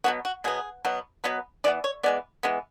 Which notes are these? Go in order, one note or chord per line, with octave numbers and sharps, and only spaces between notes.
B2 F#3 B3 F#4
F#4
B2 F#3 B3 G#4
B2 F#3 B3
B2 F#3 B3 B4
E3 G#3 B3 D5
C#5
E3 G#3 B3 D5
E3 G#3 B3